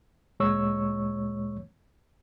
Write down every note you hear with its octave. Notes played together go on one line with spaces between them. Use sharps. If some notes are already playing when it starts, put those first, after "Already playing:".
D2 A#2 G#3 C#5 C#6 E6